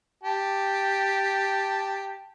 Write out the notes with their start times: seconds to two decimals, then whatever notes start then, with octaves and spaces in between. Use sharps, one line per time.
0.24 G4 A5